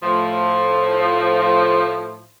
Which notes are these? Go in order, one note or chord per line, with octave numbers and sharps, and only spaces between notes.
A2 F3